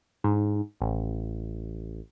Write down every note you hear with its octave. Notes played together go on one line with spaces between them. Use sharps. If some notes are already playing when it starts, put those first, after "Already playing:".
G#2
A1